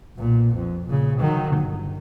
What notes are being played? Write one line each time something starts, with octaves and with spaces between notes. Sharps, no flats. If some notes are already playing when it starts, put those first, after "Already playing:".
B1 A#2
F2
A#2 C#3
D#3 F#3
G1